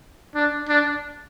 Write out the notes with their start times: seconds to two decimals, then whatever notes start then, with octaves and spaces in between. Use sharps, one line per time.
0.35 D4
0.69 D4